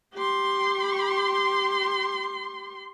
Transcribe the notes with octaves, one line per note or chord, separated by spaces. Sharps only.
G4 C6